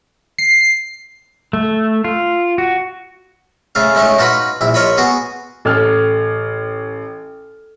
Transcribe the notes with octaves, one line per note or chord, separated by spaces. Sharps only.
C7
A3
F4
F#4
C#3 A3 G#4 F5
G#3 A3 C#4 D#4
D#4 F4 F#4 B4 B5
A#1 E4
F4 A#4 C#5 D#5 B5
B3 F#4 G#4
A1 A4 E6 F6